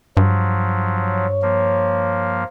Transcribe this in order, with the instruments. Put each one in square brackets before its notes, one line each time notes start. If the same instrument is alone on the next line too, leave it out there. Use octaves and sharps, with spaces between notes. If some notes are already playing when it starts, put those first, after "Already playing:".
[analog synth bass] G2 [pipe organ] F3 F#3
[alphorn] C#5
[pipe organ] F3 A#3